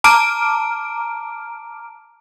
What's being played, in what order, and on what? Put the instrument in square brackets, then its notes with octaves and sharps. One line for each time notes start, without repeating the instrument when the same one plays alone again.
[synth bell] A5 A#5 D6 F6 D7